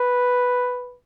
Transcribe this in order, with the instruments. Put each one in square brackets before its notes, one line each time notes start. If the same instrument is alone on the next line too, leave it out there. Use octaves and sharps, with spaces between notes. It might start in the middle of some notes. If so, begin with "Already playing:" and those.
Already playing: [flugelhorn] B4